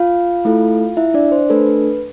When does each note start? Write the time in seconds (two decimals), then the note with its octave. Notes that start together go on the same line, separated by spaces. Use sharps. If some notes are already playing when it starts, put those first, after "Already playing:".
Already playing: F4 F5
0.45 A3 E4 A4
0.97 E4 E5
1.14 D4 D5
1.32 C5
1.50 A3 D4 A4 B4